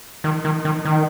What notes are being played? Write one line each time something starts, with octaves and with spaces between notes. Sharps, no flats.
D#3
D#3
D#3
D#3